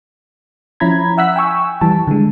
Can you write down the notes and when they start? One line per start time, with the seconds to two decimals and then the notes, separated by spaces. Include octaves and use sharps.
0.80 F3 C#4 E4 A#5 B5 G#6
1.18 E5 F#5 E6 F#6 B6
1.36 G5 G#5 C#6 E6
1.81 E3 G3 A5
2.07 D3 G#3